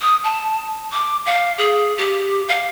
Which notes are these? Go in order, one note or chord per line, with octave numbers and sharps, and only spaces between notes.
D#6
A5
D6
F5
G#4
G4
F5